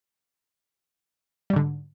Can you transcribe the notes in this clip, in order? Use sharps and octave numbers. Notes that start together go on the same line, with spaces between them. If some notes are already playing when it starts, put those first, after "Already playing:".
G#2 D3 G3